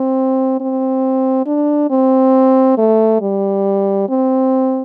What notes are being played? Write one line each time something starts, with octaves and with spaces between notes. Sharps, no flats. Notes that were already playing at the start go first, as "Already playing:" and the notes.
Already playing: C4
C4
D4
C4
A3
G3
C4